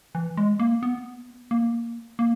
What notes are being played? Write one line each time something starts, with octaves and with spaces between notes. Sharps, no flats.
E3
G#3
A#3
B3
A#3
A#3